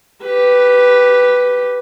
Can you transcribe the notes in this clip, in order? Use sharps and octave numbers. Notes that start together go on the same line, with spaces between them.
G4 B4